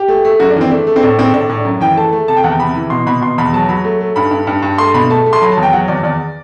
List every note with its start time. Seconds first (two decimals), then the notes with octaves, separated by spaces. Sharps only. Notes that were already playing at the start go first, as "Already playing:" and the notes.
Already playing: G4
0.08 A3
0.25 A3
0.40 F#2 F#4
0.50 D4
0.56 E3 C4
0.71 A3 D4
0.87 A3
0.96 C4
1.03 A2 D4
1.18 A2 C4
1.33 A2 D4
1.50 A2
1.65 F#2
1.81 E3 G5
1.96 A3 A5
2.12 A3
2.28 C3 A5
2.36 G5
2.44 E2 F#5
2.51 G5
2.60 C3 B5
2.76 E3
2.90 B2 C6
3.06 B2 B5
3.21 B2 C6
3.38 E2 B5
3.53 F#3 A5
3.69 F#3 B5
3.84 A3
4.00 A3
4.16 G2 B5
4.31 G2
4.47 G2
4.62 G2
4.78 A3 C6
4.94 B2 B5
5.10 A3 A5
5.26 A3
5.33 C6
5.42 F#3 B5
5.52 A5
5.57 E2
5.63 G5
5.73 F#3 F#5
5.88 E2 D5
6.03 E2 D5